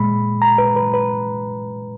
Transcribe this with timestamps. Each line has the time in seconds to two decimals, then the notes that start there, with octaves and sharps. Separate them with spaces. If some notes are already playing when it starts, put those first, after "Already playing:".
Already playing: A#2 G#3 B5
0.42 A#5
0.58 B4
0.76 B4
0.94 B4